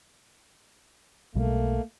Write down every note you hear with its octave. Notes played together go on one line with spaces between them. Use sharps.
B1 B2 G3 A3 A#3